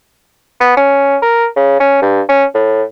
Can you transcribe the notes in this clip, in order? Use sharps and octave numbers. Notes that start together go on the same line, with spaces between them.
B3
C#4
A#4
C#3
C#4
G2
C#4
A2